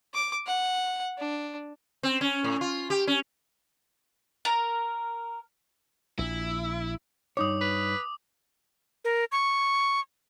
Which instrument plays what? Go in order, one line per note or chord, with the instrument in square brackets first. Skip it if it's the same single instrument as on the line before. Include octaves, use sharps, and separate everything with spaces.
[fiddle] D6
F#5
D4
[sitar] C4
C#4
A2
F4
G4
C#4
[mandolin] A#4
[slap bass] A#1 [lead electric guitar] E4
[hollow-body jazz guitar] G2 D#4 C#5 [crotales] D6 D#6
[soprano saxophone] B4
[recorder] A#4
C#6